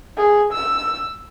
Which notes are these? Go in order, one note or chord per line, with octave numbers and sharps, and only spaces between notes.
G#4
E6